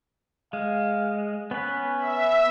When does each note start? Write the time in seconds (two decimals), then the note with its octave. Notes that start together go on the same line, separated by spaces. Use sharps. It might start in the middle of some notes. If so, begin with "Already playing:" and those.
0.53 G#3 F5
1.51 B3 C#4 B4
1.97 E5